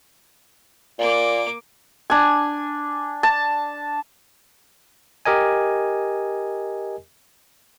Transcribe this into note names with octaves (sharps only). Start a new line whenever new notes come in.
A#2 A#3 D6
D4 G#5
A5
G4 A#4 D#5 G#5